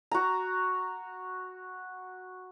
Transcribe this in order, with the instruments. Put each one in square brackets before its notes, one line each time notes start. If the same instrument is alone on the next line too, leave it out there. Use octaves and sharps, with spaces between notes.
[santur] F#4 A#5